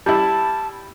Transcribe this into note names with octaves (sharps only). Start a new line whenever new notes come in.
G3 E4 A5